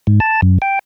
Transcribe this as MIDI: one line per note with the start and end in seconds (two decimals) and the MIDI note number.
0.07 0.20 44
0.20 0.41 81
0.42 0.58 42
0.62 0.79 79